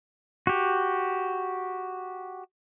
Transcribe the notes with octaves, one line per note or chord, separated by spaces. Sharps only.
F#4 G4